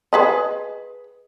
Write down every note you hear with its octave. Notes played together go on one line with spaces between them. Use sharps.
G#4 B4 D#5